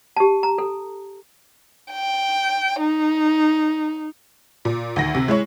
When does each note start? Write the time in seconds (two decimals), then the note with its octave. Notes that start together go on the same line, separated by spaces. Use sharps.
0.17 G4 A5
0.43 A#5
0.58 A4
1.92 G5
2.80 D#4
4.65 A#2
4.96 D2 D#3 A#6
5.15 C3
5.28 G#3 E4 C#5